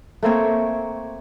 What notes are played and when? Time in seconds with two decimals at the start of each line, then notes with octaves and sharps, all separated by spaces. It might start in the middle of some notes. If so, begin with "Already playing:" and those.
0.23 A3 A#3 C4 C#5